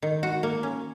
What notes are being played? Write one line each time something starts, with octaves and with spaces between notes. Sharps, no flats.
D#3
F#4
A#3
C#4